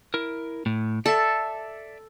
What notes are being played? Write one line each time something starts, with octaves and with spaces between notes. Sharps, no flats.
E4 A#4
A2
A4 D5 E5